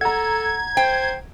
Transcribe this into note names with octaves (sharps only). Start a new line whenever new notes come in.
A4 F#5 A#5 G#6
C5 G5